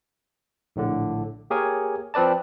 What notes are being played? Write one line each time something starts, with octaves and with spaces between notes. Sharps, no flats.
A#1 A2 D3
A#3 G4 G#4 A#4 C#5 G#5
F3 C4 B4 D5 A5